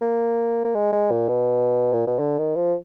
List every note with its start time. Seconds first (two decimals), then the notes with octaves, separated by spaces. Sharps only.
0.01 A#3
0.64 A#3
0.75 G#3
0.93 G#3
1.11 A#2
1.28 B2
1.93 A#2
2.07 B2
2.19 D3
2.38 D#3
2.56 F3